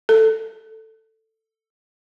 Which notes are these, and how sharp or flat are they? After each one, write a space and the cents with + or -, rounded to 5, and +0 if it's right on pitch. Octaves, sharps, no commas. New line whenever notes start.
A4 +10